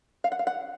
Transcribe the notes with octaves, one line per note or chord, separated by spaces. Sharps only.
F5
F#5
F5
F#5